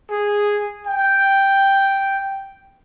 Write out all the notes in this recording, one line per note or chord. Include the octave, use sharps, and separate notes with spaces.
G#4
G5